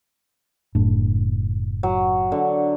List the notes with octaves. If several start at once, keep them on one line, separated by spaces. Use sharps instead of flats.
F#1 A2 D4
F#3
D3